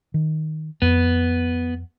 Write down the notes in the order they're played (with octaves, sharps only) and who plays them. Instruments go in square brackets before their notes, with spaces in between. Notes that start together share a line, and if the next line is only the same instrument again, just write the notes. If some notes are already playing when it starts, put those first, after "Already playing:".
[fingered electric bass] D#3
[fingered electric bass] F2 [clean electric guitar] B3